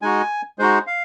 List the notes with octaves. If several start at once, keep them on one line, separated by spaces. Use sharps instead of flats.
G#3 D#4 F#4 G#5
G#3 D#4 F#4 C5
F5